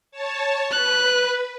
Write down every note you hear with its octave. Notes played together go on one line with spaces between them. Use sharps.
C#5 A5
B4 F#6